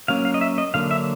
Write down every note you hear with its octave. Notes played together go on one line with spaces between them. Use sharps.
F#3 A#3 C#4 F5
F5
D#5
E5
D#5
D3 F#3 A#3 F5
E5